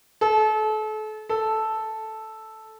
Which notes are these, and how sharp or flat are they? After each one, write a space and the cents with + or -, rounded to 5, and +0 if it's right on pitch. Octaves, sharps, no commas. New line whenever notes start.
A4 -35
A4 -5